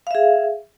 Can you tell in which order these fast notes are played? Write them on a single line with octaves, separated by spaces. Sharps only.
F5 E5 G#4